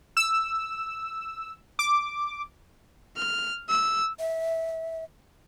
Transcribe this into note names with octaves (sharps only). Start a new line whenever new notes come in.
E6
D6
F6
E6
E5